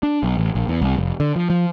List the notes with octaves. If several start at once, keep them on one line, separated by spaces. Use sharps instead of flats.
D4
B1
A1
A#1
E2
C2
F1
D3
F3
F3